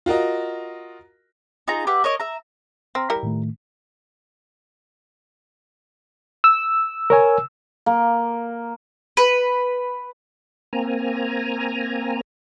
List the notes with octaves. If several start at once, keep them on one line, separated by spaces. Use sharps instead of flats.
F4 F#4 A#4 D#5
D#4 F4 G#4 A#5
G4 B4 E5 F#5
A#4 C#5 D#5
E5 A#5
C4 A#5 F6 A#6
G3 E4 A#4
A2 D#3 A3
E6
A#4 C#5 G#5
A#3
B4
A#3 C4 G#5 A#5